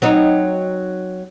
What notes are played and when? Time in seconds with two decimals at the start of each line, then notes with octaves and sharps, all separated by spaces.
0.02 F#3 C4 D#4